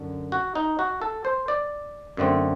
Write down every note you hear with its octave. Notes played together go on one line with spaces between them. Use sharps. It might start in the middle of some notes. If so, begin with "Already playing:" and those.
Already playing: F#2 D3
F#4
D#4
F#4
A4
C5
D5
F#2 D3 A3 C4